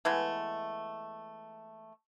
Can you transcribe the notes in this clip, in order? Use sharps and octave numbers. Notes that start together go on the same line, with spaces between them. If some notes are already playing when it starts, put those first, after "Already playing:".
E3 G#3 A3 B3